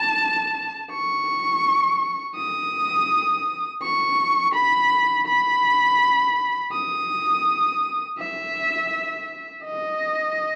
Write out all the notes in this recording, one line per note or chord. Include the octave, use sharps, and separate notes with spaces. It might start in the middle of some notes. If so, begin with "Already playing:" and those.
Already playing: A5
C#6
D#6
C#6
B5
B5
D#6
E5
D#5